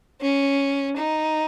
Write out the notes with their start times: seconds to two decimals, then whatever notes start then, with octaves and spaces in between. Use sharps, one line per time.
0.21 C#4
0.96 D#4